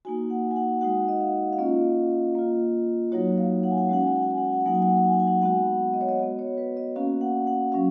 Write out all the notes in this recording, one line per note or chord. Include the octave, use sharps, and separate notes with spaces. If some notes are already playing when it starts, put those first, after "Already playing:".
A#3 D#4 F#4 G#5
F#5
G#5
F#5
G#3 D#4 F#4 F#5
D#5
F5
F5
A#3 C#4 F4 D#5
A#3 F4
F#3 A#3 D#4 F#4 C#5
F5
F#5
G#5
F#5
G#5
G#3 C#4 F#4 F#5
G#5
F#5
G#5
F#5
G#5
F#5
G#5
F#5
G#5
F#3 A#3 D#4 F#4 F#5
G#5
F#5
G#5
F#5
G#5
F#5
G#5
F#5
G#3 B3 F#4 F#5
D#5
C#5
D#5
B3 F#4
C#5
B4
D#5
A#3 C#4 F#4 F5
F#5
F#5
F#3 C#4 F#4 F5